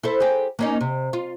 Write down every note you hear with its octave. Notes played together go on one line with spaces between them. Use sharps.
E4 A4 C5
G4 G#4
A#3 C#4 D#4
C3
F4